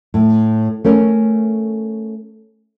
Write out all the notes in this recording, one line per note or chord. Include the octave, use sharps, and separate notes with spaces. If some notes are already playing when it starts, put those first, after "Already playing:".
A2
A3 C#4 A#4